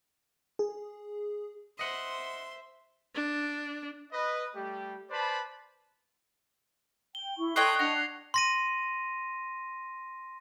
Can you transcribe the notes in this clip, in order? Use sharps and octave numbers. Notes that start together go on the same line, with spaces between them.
G#4
C5 D#5 E5 F#5 C6
D4
B4 D#5
G3 A3 G4
B4 C5 D5 A5 B5
G5 G7
E4 C#6
A4 C#5 D#5 G5 C6 F#6 G#6 C7
D4 F#5 F#6 A#6 C#7 F7
C6 A#6 D#7